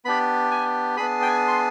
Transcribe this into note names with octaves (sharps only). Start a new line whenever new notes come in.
B3 D4 G4 B5
G#5
B3 D4 G#4 B5
G5
G#5
C6